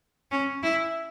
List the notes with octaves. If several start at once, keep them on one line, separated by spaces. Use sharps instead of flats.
C#4
E4